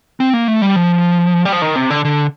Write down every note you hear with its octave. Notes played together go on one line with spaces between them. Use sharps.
C4
A#3
A3
G3
F3
G3
F3
D#3
C3
D3
D3